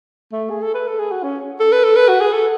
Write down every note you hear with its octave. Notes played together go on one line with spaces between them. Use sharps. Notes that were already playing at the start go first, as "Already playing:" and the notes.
A3
G#4
A4
B4
A4
G#4
F#4
C#4
A4
B4
A4
B4
F#4
G#4
A4